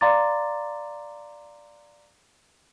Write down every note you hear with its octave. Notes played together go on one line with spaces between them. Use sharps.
D5 F5 A#5 C6 D6 A6